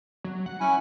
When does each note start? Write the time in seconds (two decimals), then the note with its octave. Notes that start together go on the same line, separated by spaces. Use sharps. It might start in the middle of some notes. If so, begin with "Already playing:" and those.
0.24 F#3
0.46 F#5
0.60 C#4 E4 G#5